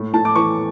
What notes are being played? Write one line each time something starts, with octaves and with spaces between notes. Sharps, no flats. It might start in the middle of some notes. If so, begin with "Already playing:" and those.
Already playing: A2
A2 A5
D6
E3 C#6